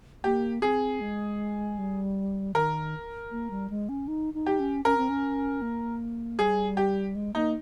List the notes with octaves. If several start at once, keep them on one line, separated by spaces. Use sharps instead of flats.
A#3 G4
C4 G#4
G#3
G3
D#3 A#4
A#3
G3
G#3
C#4
D#4
D#4
G4
C#4
C#4 A#4
C4
C#4
A#3
G3 G#4
G4
G#3
A#3 D#4